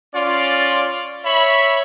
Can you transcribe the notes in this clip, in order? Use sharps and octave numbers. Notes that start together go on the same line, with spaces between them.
C#4 F4 D5
C#5 E5 B5